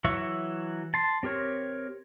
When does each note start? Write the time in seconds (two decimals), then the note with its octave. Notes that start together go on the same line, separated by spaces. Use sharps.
0.04 E3 F#3 F#4 E5 C#6
0.94 A5 C6
1.23 C4 G4 A#4 C#5